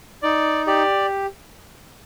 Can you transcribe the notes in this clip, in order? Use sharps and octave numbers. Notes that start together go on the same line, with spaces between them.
D#4 D5
G4 D5